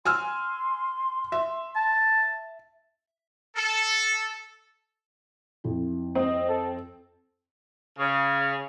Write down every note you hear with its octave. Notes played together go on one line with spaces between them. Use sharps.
G#5 C6 E6 F6
E5
A5
A4
F2 E4
C4 D#5
A4
C#3